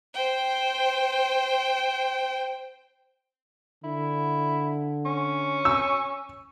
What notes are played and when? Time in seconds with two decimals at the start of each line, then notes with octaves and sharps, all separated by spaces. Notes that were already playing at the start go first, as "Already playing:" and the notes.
0.14 C5 G5
3.84 D3 E4
5.05 C#4
5.65 E6